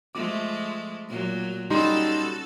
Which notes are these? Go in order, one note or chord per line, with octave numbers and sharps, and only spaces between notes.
F3 G#3 A3 D6
A#2 F#3
G3 C#4 D#4 F#4 A4 C6